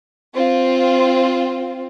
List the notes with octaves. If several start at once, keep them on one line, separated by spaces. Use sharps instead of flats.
C4 F4